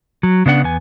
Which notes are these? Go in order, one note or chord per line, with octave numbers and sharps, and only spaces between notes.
F#3
C#3 B3 D4 F#5
E2 B3 G#5